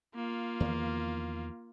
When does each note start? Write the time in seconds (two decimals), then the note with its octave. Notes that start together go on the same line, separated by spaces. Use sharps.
0.15 A#3 F4
0.60 E2 D#3 F3